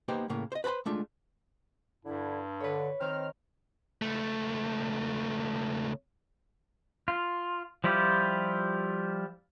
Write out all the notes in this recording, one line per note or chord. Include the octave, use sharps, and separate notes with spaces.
A#3 B3 D#4 G4 B4 C5
A2 C#3 A#3
C5 D#5
B4 C5 A5 B5 C6
G#3 A3 D4 F4
G2 D3 E4
D3 B4 C#5
D#3 C4 D#4 F6
C#2 A3
F4
F3 G3 E4 F4 G4